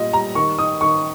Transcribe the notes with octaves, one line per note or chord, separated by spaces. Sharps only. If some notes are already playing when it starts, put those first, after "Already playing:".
Already playing: A#2 G3 F4 D#5
G3 A#5
D#3 C#6
D#4 D#6
D#3 C#6